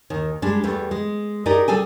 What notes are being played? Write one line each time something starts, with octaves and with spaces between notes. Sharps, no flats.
D#2 D#3
G3 G#3 D4
E2 G3 A3
G#3
D#4 G4 G#4 A#4 D5 D#5
G3 G#4 A4 G#5